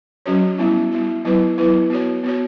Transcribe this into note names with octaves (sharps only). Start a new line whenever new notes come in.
F#3 C#4 F#4 C#5
G3 B3 E4
G3 B3 E4
F#3 B3 E4 B4
F#3 B3 E4 B4
B3 F#4 C#5
B3 F#4 C#5